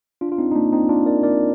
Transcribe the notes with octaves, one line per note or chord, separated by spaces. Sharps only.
D4 F4
F4
C4 D#4
D#4
A#3 D4
C4 D#4
D4 F4
A#4 D5
A#4 D5